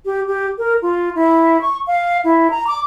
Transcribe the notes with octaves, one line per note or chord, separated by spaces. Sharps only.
G4
G4
A#4
F4
E4
C#6
F5
E4
A#5
D6